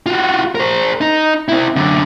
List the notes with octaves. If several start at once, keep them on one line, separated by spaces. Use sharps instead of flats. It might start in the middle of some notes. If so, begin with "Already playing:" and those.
F4 F#4
A#4 C5
D#4
C4 E4
F#2 D3